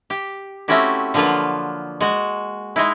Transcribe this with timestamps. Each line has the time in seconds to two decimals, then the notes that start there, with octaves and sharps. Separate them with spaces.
0.10 G4
0.68 A3 C4 C#4 E4 F#4 G4
1.14 D3 F3 F#3 A#3 F4 B4
2.01 G#3 F#4
2.76 G#3 D#4 E4